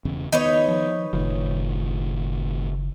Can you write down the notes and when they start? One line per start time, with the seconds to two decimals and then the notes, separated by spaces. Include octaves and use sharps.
0.05 E1 E2 C#3
0.32 D#3 B3 D#4 B4 C#5
0.68 F3
1.13 F#1 A2 D#3 F3